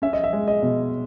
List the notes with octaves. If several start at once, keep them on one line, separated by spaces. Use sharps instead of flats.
C#4 E5
D#5
E5
G#3
D#5
B2